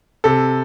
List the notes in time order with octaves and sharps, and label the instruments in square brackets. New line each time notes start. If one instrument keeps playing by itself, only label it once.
[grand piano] C3 A4